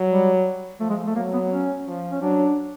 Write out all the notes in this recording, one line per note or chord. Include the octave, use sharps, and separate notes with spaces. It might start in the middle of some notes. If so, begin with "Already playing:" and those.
Already playing: F#3
G3
F3 A3
G#3
A3
F#3 A#3
B3
C#4
F3
C#4
F#3 D4